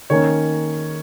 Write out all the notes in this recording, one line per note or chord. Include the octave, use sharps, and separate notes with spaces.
D#3 A#3 C#4 C#5